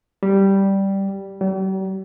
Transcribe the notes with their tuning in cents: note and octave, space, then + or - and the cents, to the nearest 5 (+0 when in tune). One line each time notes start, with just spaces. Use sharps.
G3 -5
G3 -45